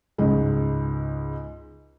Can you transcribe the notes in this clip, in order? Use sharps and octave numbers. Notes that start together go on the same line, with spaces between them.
C#2 G#2 G#3